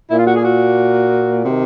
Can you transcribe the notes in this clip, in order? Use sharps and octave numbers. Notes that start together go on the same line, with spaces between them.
A#2 E4
F4
F#4
G#4
F#4
C3 D#3